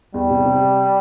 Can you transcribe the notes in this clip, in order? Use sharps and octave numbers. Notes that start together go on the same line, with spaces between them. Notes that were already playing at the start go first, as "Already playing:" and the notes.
E2 G3
C3
C3